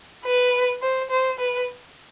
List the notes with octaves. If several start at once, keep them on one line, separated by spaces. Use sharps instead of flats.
B4
C5
C5
B4